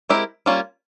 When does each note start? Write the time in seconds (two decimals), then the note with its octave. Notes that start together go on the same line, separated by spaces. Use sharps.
0.09 G#3 C4 E4 G4 A#4
0.46 G3 A#3 C#4 F4